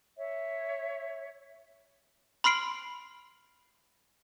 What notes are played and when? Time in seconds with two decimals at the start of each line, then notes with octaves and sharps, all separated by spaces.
0.17 C#5 E5
2.44 B5 C6 F6 C7 D7 F#7